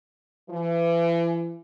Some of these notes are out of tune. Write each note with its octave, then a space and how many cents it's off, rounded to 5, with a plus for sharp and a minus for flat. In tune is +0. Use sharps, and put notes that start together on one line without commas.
E3 +35